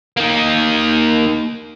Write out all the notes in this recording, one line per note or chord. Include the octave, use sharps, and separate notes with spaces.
D#3 A#3